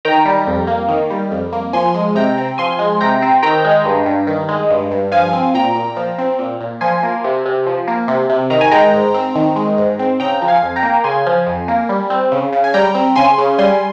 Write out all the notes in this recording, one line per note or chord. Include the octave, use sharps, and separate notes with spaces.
D#3 G5 A#5
G3
F2
A#3
D#3
G3
F2
A#3
F3 G#5 C6
G#3
C3 G5 A#5
C4
F3 G#5 C6
G#3
C3 G5 A#5
C4
D#3 G5 A#5
G#3
G2
G2
D#3
G#3
G2
G2
F3 F5 G#5
C4
A#2 G5 A#5
A#2
F3
C4
A#2
A#2
F3 G#5 C6
A#3
C3
C3
F3
A#3
C3
C3
D#3 A#5
G#5
G#3 G5 A#5
G#2
C4
D#3
G#3
G#2
C4
C#3 G5 A#5
F3
F5 G#5
F2
G5 A#5
A#3
C#3 G#5 C6
F3
F2
A#3
G3
C4
C#3
C#3
G#5
G3 G5 A#5
C4
C#3 G#5 C6
C#3
G3 G#5 C6